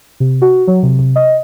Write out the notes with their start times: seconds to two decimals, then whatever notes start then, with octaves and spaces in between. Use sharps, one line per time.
0.20 C3
0.42 F#4
0.67 F#3
0.83 C3
0.99 C3
1.16 D#5